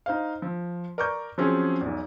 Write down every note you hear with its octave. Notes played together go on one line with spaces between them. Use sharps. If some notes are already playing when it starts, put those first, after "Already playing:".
D#4 C5 F5
F3
A#4 D5 A#5 C#6 D6 G6
F3 F#3 C4 C#4 F4 G#4
B1 E2